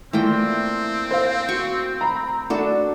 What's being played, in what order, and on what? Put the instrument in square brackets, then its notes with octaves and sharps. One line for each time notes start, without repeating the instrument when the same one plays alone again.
[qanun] E3 F4 G5 [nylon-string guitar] A3 A#3 D5 [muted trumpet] C4
[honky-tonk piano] C5 F5
[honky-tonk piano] F#4 [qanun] C#6
[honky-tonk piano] A#5 B5
[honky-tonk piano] A3 [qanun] D4 F#4 A4